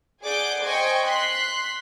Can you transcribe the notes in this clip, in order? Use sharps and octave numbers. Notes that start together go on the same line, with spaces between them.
G#4 D5 F#5 D6 G6
C5 D#5 G5 G#5 C#6
C6 F#6 B6